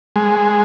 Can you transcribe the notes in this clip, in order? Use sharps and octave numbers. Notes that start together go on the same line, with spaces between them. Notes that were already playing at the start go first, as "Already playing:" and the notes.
G#3